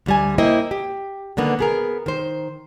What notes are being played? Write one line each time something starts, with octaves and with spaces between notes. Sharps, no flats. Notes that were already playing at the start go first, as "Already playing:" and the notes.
D2 G3 G#5
A#3 E4 C5 D#5 G5
G4
D3 D#3 A#3 B3
B3 G#4 A#4
D#3 C5